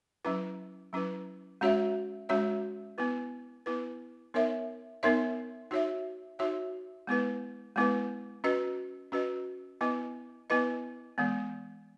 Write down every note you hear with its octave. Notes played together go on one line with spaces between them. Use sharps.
F#3 C#4 E4 B4
F#3 C#4 E4 B4
G#3 C#4 F#4 C#5 E5
G#3 C#4 F#4 C#5 E5
B3 E4 B4
B3 E4 B4
B3 D#4 A#4 C#5 E5
B3 D#4 A#4 C#5 E5
D#4 F#4 C#5 E5
D#4 F#4 C#5 E5
G#3 B3 E4 B4
G#3 B3 E4 B4
C#4 F#4 B4 D#5
C#4 F#4 B4 D#5
B3 E4 B4 D#5
B3 E4 B4 D#5
E3 G#3 B3